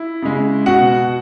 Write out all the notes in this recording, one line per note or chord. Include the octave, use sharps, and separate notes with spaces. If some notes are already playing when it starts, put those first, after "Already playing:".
Already playing: E4
C#3 G#3
B2 F#4 F#5